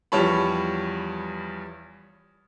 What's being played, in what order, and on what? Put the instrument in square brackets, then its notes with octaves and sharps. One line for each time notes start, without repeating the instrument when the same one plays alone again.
[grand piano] E2 F3 G3 C#5 A5 B5